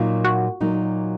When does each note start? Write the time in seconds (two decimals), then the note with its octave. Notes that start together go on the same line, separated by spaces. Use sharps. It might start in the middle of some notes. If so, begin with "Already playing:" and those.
Already playing: A#2 F#3 A#3 D#4 F4
0.24 F#4
0.60 A#2 F#3 A#3 D#4